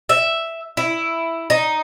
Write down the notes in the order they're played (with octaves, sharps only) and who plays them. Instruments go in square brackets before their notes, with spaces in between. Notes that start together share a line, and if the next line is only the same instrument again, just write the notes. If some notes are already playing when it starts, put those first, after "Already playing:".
[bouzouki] E5
E4
D#4